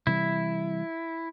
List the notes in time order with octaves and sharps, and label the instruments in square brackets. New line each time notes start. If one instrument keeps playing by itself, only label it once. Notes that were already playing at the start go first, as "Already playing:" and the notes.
[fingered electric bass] C3 E3 G3 [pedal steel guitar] E4